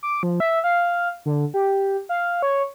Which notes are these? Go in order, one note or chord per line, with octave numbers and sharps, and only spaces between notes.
D6
F3
E5
F5
D3
G4
F5
C#5